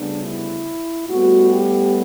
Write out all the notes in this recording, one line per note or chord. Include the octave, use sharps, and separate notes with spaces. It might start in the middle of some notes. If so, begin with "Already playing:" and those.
Already playing: D2 C#3 G3 B3 D4
E4
A2 G3 B3 F#4
G4